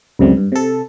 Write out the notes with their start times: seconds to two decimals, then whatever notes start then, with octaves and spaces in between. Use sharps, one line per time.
0.19 C#2 F#2 C3 G3
0.37 G2
0.52 C3 A4